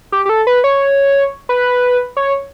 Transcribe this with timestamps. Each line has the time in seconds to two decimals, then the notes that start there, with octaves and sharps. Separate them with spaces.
0.12 G4
0.26 G4
0.29 A4
0.47 B4
0.64 C#5
1.49 B4
2.17 C#5